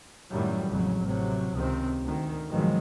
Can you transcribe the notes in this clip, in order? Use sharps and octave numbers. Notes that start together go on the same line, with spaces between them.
F#2 A2 D#3 F#3 G3
A1 F2 C#3 F#3
A1 C3 F#3
C#2 C3 D#3 C4
D2 D#3
G#2 B2 D#3 F3 F#3 G#3